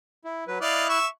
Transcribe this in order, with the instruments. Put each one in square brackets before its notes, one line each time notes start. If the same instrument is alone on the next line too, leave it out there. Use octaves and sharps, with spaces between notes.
[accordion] E4
F#3 B4
[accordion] E4 F#6 [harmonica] D5 D#5 F5
[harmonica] E5 C#6